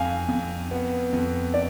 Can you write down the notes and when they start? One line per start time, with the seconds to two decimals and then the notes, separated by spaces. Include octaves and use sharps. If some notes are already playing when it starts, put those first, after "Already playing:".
Already playing: F2 F5 G#5
0.28 F2
0.71 B3
1.13 F2
1.54 D5